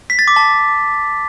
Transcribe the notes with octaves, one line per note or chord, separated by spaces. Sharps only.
B6
A6
D6
A5